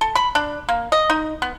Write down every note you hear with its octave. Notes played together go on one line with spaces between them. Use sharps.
A4
B5
D4
A#3
D#5
D#4
B3